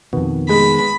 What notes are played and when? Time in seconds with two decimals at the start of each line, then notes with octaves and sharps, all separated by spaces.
0.13 F2 B2 D#3 B3
0.49 G#3 B5